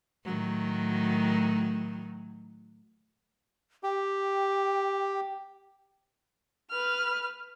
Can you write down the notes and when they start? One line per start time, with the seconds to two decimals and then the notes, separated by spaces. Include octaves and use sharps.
0.24 A2 D#3 F#3
3.83 G4 G5
6.71 B4 F6